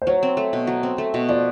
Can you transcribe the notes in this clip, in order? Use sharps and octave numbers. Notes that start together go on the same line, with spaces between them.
C5
F#3 C#5
C4
A3
B2
F#3
C4
A3
B2
F3 D5